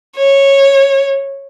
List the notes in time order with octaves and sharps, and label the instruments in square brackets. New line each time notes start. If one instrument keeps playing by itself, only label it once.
[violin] C#5